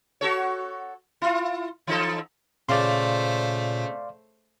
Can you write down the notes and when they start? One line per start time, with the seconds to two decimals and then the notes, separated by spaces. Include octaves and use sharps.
0.21 F#4 A4 C#5
1.22 E4 F4
1.87 E3 D#4 A4
2.69 A#2 C#3 A3 C5 D5 F5 C6